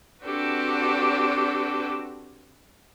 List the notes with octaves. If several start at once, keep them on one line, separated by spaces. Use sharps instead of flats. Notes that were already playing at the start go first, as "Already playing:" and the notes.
C4 D4 F#4 G4 A4 B4